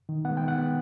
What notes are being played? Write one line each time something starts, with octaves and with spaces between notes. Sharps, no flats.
D#3
B3 F#5
G#3
G5
D#3
F#5
G#3 B3